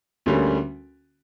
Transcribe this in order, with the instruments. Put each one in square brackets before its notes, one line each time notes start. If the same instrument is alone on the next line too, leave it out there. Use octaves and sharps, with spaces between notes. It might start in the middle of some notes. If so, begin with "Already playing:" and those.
[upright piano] D2 D3 G3 A#3 C#4